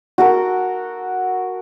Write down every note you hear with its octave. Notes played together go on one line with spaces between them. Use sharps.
F#4 A4 A#4